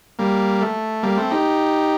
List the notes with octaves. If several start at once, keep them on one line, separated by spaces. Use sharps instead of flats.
G3 A#3
A3
G3 A#3
A3 C4
D#4 G4